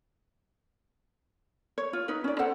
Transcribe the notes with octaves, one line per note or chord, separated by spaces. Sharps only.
C#5
F4
D#4 B4
C#4 D5
A4 C5 F#5